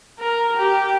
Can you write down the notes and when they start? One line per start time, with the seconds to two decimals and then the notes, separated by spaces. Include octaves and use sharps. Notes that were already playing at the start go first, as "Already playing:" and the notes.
0.19 A#4
0.57 G4